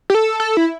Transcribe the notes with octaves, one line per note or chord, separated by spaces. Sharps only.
G4
A4
A4
E4